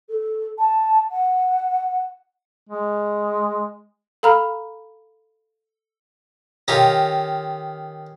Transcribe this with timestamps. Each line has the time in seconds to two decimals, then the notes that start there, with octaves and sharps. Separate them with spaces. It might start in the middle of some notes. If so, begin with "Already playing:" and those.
0.09 A4
0.59 A5
1.11 F#5
2.70 G#3
4.23 A4 F5 A#5 B5 F6
6.68 D#3 C#4 D#4 F4 G4 A4